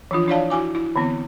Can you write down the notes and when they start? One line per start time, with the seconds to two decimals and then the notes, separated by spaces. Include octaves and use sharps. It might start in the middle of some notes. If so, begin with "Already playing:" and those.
0.11 E3 F3 D4 F4
0.28 D4 E4 C#5 D5 F5 A5
0.50 E4 F#4 G#5 D6
0.75 E4
0.96 D3 E3 B3 C4